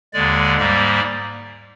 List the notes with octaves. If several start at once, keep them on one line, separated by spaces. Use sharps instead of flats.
D#2 D3 G#3 D5
G#2 G3 A#3 D5